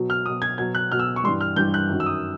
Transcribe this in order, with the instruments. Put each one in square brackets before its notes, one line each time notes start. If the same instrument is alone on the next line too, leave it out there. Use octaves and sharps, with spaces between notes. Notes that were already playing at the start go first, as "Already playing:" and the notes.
Already playing: [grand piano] B2 F#3
F6
B2 F#3 D#6
G#6
B2 F#3 G#6
F#6
B2 F#3 F6
E6
C#6
G2 E3 G3 C6
F6
G2 E3 G3 G6
F#6
F#2 D#3 F#3
E6
D#6